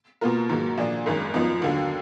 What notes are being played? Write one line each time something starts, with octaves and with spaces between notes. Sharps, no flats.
B2 A#3 F4 A#4
G#2 D#3 F#3 A#3
A#2 F3 A#3 D4
G#1 F#2 D#3 G#3
F#2 F3 B3 D#4
D#2 D3 F#3